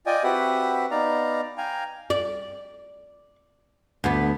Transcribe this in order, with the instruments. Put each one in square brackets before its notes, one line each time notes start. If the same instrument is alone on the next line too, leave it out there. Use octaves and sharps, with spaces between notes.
[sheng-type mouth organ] F4 D5 D#5 G5 G#5
C4 F#4 G4 B4 E5 F#5
B3 D#4 D5 F5 A#5
F5 G5 G#5 A#5
[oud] D5
D2 B3